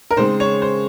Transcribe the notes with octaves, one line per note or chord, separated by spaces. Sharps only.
A#4
C#3 G#3 C4 D#4 C5
C#5
C5